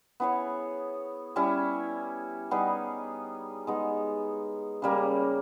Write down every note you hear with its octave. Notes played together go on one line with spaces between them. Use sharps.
B3 E4 G#4 C#5
G3 C#4 E4
G3 B3 D#4 G#4
G#3 B3 D#4
C#3 G3 A#3